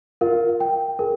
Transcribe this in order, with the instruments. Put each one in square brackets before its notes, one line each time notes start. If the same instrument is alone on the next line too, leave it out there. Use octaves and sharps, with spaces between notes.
[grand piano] F4 [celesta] A#4
[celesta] G5
[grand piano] G#4 [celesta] A#4